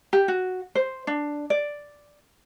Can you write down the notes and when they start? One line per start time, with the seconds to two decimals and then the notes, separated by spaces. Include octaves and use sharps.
0.13 G4
0.28 F#4
0.75 C5
1.07 D4
1.50 D5